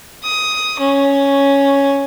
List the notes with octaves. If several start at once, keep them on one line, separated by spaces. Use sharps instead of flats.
D#6
C#4